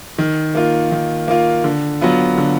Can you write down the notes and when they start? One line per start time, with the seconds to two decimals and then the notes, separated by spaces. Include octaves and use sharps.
0.18 D#3
0.55 A#3 F4
0.92 D#3
1.28 A#3 F4
1.64 D3
2.01 F#3 B3 F4
2.38 D3